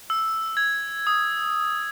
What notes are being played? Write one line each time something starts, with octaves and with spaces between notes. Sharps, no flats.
E6
G#6
D#6